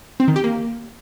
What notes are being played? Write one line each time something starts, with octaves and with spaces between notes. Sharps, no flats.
C4
D#3
G4
A#3